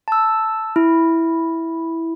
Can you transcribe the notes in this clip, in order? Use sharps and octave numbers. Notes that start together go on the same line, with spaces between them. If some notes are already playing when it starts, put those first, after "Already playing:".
A5 E6
E4